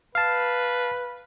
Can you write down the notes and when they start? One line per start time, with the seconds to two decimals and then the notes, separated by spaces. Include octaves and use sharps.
0.15 B4 F5 A5